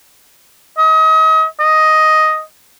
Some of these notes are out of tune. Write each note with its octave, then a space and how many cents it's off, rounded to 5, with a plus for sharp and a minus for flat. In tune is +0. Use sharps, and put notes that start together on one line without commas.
D#5 +35
D#5 +5